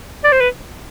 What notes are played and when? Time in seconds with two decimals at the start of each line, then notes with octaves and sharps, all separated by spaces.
0.24 D5
0.32 C5
0.41 B4